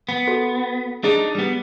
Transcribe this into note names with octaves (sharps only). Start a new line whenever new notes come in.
B3
F#4 A4
D4 D#4 G#4
G3 B3